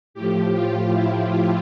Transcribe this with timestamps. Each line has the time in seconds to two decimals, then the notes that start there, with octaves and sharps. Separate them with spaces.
0.14 A2 F3 G4
0.53 F4
0.93 E4